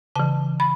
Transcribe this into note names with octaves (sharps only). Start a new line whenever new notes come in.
C#3 E3 A5
B5